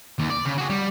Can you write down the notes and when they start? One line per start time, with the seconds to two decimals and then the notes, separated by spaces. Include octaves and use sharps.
0.19 D#2
0.30 D5
0.45 C#3
0.58 F#4 G#4
0.70 G3